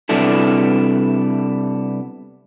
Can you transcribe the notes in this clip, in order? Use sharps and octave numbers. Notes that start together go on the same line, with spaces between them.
C3 G3 B3 D4 E4 A4